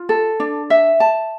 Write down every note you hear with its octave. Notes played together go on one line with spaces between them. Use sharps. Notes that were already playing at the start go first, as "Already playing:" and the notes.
Already playing: F4
A4
D4
E5
A5